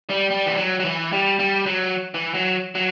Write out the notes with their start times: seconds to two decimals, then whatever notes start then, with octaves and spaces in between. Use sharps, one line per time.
0.10 G3
0.30 G3
0.46 E3
0.57 F#3
0.80 F#3
0.85 E3
1.12 G3
1.39 G3
1.66 F#3
2.14 E3
2.34 F#3
2.75 F#3